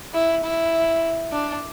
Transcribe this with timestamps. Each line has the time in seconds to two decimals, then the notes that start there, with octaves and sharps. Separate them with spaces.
0.14 E4
0.44 E4
1.32 D4